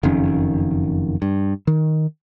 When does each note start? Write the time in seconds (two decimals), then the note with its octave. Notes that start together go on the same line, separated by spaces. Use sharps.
0.03 F#1 F2 D#3 C#4
1.22 G2
1.67 D#3